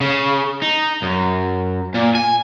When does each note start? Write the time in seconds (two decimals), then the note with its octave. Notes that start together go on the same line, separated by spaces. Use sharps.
0.01 C#3
0.62 D#4
1.02 F#2
1.94 A#2
2.15 G#5